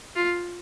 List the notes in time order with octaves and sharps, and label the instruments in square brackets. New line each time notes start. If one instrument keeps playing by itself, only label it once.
[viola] F4